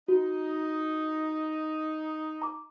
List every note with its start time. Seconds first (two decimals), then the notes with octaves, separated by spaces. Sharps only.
0.08 D#4 F#4
2.42 A#5 D6